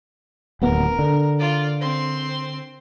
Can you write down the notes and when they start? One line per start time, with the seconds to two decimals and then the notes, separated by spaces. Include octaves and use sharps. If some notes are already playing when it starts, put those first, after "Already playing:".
0.62 D1 D#2 B3 A#4
0.99 D3
1.39 F4 D5
1.81 C4 C6